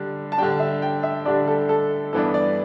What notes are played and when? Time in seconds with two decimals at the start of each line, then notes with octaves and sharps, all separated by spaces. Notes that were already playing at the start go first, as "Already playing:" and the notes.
Already playing: D3 G3 D4
0.32 A5
0.38 D3 G3 D4 G5
0.60 E5
0.82 G5
1.03 E5
1.25 D3 G3 D4 D5
1.47 A4
1.69 A4
2.13 G2 E3 B3 D4 A4
2.34 D5